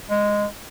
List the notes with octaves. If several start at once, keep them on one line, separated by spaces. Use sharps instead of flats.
G#3